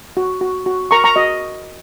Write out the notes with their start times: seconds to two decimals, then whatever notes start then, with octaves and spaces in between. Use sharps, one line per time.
0.17 F#4
0.41 F#4
0.66 F#4
0.91 A#4 A#5 C#6
1.04 A#5 C#6
1.16 F#4 D#5